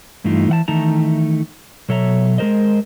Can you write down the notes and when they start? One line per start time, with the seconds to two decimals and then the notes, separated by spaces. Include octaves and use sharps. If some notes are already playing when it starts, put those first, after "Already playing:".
0.24 G2 E3 A3 D#4 F4
0.49 E3 F#5 A5
0.68 D#3 E3 A3 D#4 A5 A#5
1.89 B2 F#3 A4 C#5 E5 A#5
2.38 G#3 G#4 A#4 C5 D#5